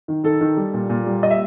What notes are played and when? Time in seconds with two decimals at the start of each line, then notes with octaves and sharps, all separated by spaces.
0.08 D#3
0.24 D#3 A4
0.41 D#3
0.57 G3
0.74 A#2
0.90 A#2
1.06 G3
1.23 D#5
1.31 E5